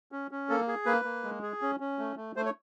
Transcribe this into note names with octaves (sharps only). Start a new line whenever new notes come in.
C#4
C#4
A#3 A4
G#4
A#3 B4
A#3
G#3
G#4
C#4
C#4
A3
A3
A3 C5
C#5